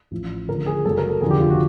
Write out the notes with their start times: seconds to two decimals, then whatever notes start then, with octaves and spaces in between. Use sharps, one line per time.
0.11 A1 A2 F3
0.48 D#2 D3 F3 A#4
0.66 G#4
0.84 F#1 F#2 C#3 F#3 A4
0.98 A#4
1.09 A4
1.21 F1 D#2 D3 F3 G#4
1.31 G4
1.40 F4
1.50 F#4